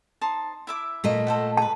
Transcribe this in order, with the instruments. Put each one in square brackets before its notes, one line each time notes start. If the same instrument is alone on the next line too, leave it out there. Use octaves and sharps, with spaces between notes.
[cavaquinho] D#4 C5 A5
E4 E5 D6
[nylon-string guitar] A#2 A3 D#5
[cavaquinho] A4 C5 F#5
[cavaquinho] B4 A#5 [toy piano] A5